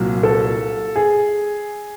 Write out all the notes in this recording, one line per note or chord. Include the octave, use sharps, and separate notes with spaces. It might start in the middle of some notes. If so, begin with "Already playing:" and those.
Already playing: C2 A#2 F#3
A4
G#4